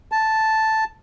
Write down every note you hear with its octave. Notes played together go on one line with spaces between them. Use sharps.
A5